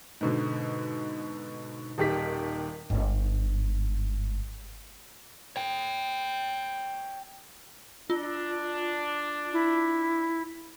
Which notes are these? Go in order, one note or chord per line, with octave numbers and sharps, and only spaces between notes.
G#2 B2 D3
D#1 D#2 G4 B6
G1 G#2
C#5 G5
D4 F4
E4